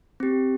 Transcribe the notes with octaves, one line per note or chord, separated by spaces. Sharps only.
C4 G4